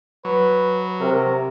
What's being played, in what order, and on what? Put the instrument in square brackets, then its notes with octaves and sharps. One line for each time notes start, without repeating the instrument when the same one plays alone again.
[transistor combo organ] F#3 [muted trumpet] B4
[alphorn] C3 [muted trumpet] A#4